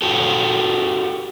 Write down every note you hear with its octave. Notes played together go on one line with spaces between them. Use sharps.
F#4 G4 A4